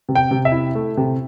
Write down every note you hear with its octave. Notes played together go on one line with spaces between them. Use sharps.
C3
G5
C3
E5
E4
A3
C3